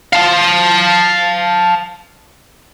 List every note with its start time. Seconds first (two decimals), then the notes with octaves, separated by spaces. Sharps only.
0.13 F5 A5